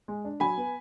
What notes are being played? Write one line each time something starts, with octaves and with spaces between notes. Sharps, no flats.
G#3
D4
F#3 G#5 B5
B3